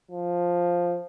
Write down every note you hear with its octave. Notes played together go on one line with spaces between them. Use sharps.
F3